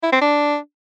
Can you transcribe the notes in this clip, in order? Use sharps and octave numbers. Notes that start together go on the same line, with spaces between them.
E4
C4
D4